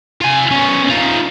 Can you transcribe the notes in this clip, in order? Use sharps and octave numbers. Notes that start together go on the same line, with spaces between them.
F4 G#5
B3 C#4
D#4 F4